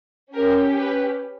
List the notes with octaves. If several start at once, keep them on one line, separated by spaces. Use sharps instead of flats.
C#4 G4 A#4
B4